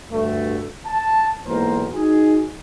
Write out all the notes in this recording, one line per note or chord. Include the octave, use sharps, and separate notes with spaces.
D2 G2 A3
A5
B1 G#2 E3 A#3 A#4 C5
D#4 F#4 G#4